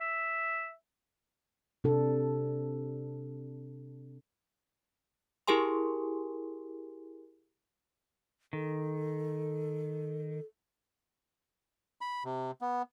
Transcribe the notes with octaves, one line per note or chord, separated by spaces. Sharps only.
E5
C3 D4 A4
E4 G4 G#4 A#4 G#5 C6
D#3 A4
B5
C3
B3